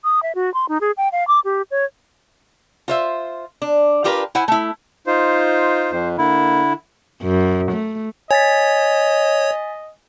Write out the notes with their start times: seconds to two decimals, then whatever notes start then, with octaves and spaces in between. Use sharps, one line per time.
0.04 D#6
0.23 E5
0.35 F#4
0.54 C6
0.69 D#4
0.81 G#4
0.97 G5
1.12 F5
1.28 D6
1.45 G4
1.71 C#5
2.88 F4 C5 E5
3.62 D4
4.04 D4 F4 G4 A#4 B4
4.35 E4 C5 F#5 G#5
4.48 A3 E4
5.07 D#4 F4 C5
5.91 F2 C5
6.18 D3 A#3 E4
7.23 F#2
7.72 A3
8.31 C#5 D#5 G#5 A6 B6